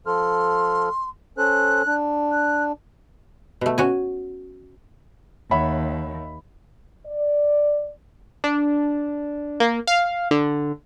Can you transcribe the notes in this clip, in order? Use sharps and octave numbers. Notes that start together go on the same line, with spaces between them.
F3 A4 C6 F6
C#4 A4 C5 F#6
D4
F#6
B2 A3
C#4 F#4 G#5
D#2 C#5 E5 F#5 B5
D5
D4
A#3
F5
D3